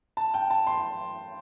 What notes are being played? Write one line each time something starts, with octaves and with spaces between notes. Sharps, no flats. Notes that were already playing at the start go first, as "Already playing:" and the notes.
A5
G5
A5
C6